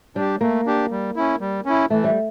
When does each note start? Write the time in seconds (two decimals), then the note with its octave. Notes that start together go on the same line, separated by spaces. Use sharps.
0.16 G3 D4 G4
0.41 A3 A#3
0.66 D4 G4
0.91 G3
1.16 C#4 E4
1.41 G3
1.66 C#4 E4
1.90 E3 A3
2.04 G3